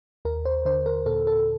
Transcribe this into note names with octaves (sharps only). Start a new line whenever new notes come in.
D#2 A#4
C5
D3 C5
A#4
A#2 A4
A4